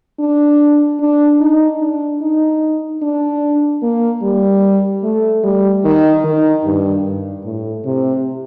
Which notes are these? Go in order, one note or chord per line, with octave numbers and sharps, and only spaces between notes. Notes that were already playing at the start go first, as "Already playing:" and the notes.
D4
D4
D#4
D4
D#4
D4
A#3
G3
A3
G3
D#3
D#3
G2
G2
A2
C3